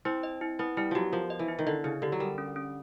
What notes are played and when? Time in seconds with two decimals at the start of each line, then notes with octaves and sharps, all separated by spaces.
0.05 C4 E4
0.23 D#5
0.41 E4
0.59 B3 E4
0.77 G3 E4
0.91 F3 F#3 G4
1.13 F3 A#4
1.30 D#5
1.39 E3
1.48 E4
1.59 D#3
1.67 D3 D#5
1.84 C#3 E4
2.02 D3 G4
2.12 F#3
2.20 G3 A#4
2.38 C#4
2.56 C#4